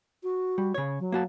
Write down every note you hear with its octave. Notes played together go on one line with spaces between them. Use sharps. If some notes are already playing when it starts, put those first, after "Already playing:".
F#4
G3
C#3 C#5
F#3
A#3 F#4 A5